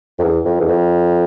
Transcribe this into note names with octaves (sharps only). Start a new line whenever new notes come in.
F2
E2
F2
E2
F2